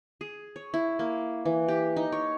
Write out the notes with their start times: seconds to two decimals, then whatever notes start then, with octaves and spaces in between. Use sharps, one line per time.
0.21 G#4
0.56 C#5
0.74 E4
0.99 A#3
1.45 E3
1.68 G4
1.96 D#4
2.12 C#5